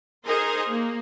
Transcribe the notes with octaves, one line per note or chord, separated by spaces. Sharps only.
D#4 G#4 A#4 C5
A#3